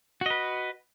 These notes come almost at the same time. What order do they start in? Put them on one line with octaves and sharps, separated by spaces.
F#4 D#5 B4